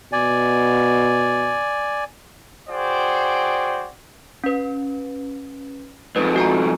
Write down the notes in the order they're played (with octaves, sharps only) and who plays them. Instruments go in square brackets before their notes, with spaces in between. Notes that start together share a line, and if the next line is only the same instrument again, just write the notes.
[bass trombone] B2 [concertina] D5 G#5
[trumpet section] F#4 G#4 C5 D5 G5
[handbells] C#4 B4
[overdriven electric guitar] F2 G#2 [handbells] B4
[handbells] F#4 G#5 A#5